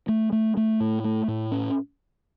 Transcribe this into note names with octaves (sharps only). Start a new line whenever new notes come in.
A3
A3
A3
A2
A3
A2
C#4